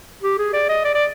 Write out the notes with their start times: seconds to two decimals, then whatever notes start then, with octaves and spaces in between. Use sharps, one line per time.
0.23 G4
0.38 G#4
0.54 D5
0.69 D#5
0.85 D5
0.95 D5